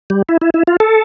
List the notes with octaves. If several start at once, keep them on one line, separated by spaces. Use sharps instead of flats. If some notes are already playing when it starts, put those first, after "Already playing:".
G3
E4
E4
E4
F4
A4